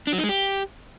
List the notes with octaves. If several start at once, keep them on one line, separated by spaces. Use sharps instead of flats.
D4
F#3
D#4
G#3
G4